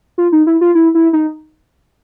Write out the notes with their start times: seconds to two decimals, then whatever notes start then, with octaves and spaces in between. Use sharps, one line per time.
0.18 F4
0.32 D#4
0.47 E4
0.61 F4
0.75 E4
0.95 E4
1.13 D#4